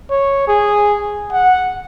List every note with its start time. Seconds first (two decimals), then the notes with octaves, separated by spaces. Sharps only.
0.11 C#5
0.48 G#4
1.32 F#5